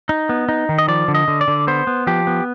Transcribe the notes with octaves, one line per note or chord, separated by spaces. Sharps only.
D#4
B3
D#4
D#3
D#5
F3 D5
D3
D#5
D3
D5
D3
B3 C5
B3
F3 G4
B3